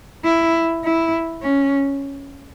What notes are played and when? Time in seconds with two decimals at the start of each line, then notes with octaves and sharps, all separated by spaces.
0.24 E4
0.84 E4
1.42 C#4